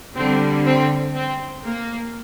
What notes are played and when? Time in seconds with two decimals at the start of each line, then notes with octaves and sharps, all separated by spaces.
0.17 D3 G3 C4
0.67 C4
1.15 C4
1.64 A#3